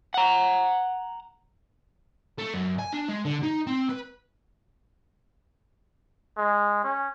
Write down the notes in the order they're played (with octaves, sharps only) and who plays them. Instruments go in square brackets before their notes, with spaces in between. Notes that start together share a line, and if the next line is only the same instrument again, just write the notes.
[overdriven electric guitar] F#5 A#5
[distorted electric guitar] A3
F#2
G#5
D4
G#3
D3
D#4
C4
B4
[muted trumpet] G#3
C#4